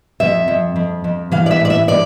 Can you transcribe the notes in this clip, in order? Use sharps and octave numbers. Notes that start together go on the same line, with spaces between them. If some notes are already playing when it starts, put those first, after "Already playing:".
F2 E5
F2
F2
F2
E3 F5
D5
E5
A2 D5
E5
A2 D5